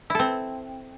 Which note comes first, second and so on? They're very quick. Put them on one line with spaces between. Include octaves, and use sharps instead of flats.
E4 A4 C4